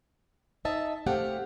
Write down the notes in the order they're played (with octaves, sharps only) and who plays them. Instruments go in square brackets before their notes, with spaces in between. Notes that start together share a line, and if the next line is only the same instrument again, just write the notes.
[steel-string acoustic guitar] D#4 D#5 E5 A5
A3 C4 G4 F5 F#5